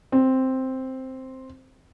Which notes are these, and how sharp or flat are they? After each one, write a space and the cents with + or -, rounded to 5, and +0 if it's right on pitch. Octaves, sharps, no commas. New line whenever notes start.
C4 +0